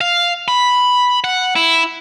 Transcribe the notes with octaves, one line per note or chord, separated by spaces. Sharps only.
F5
B5
F#5
E4